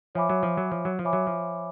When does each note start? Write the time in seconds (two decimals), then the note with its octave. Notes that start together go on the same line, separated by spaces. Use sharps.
0.15 F3 C#5 E5 G#5 B5 D6
0.30 F#3
0.43 F3
0.57 F#3
0.72 F3
0.85 F#3
0.99 F3
1.04 C#5 E5 G#5 B5 D6
1.13 F#3
1.27 F3